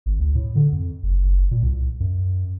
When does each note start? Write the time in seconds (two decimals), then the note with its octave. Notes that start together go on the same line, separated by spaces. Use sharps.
0.06 G#1
0.19 D2
0.35 A2
0.55 D3
0.72 F2
1.03 F#1
1.25 F#1
1.51 A#2
1.63 C2
2.00 F#2